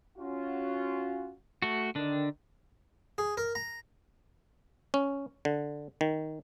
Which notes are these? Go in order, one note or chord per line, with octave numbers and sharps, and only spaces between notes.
C#4 F4 F#4
A3 F#4
D3 D#3 D4
G#4
A#4
A#5
C#4
D3
D#3